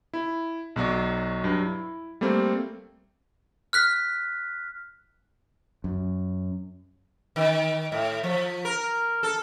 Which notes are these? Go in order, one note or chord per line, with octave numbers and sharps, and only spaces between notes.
E4
B1 F#3 F#4 D5
G2 F#3
E4
G3 A3 A#3 C4
F6 F#6 B6
F#2
D#3
A2
F3
A#4
A4